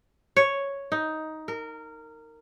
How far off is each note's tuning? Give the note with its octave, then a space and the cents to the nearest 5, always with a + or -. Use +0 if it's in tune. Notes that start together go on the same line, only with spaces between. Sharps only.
C#5 +0
D#4 +10
A#4 -20